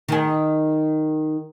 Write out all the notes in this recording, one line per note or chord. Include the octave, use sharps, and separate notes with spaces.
D#3 G#4